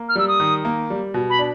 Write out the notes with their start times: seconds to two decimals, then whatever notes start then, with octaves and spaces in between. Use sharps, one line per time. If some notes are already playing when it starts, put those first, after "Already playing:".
Already playing: A#3
0.09 F6
0.16 G3 E6
0.28 D#6
0.40 D#3
0.65 A#3
0.90 G3
1.14 B2
1.30 B5
1.39 D4